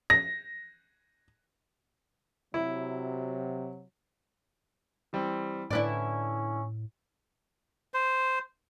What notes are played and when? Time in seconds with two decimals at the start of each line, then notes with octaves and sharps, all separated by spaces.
0.10 A#6
2.54 C3 F#3 E4
5.13 E3 G3 C4
5.71 A2 D3 C#4 E4 B4 D5
7.94 C5